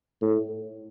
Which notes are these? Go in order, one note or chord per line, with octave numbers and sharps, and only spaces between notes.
A2